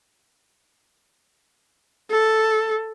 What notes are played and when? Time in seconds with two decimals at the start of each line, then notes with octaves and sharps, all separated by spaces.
2.11 A4